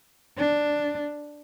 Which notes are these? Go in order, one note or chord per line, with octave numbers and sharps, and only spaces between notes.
D4